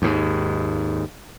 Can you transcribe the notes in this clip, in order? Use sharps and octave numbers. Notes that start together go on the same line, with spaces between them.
D#2 G#2